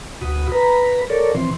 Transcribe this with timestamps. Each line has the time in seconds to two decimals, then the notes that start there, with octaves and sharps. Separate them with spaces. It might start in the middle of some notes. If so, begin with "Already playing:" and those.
0.21 D2 B2 F#4 B5 D#6
0.52 B4 A#5 B5
1.10 A4 A#4 C#5 D5
1.35 B2 E3 F3 C4 C6